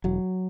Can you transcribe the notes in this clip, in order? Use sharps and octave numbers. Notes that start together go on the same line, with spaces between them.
E1 F#3